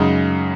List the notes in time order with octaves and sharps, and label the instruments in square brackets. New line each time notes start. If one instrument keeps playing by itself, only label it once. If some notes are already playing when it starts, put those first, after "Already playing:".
Already playing: [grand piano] F#2 C#3 G#3 D#4